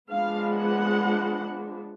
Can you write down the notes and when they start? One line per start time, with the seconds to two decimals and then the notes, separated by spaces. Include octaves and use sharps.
0.10 F3 G#3 B3 D4 F5
0.52 F#5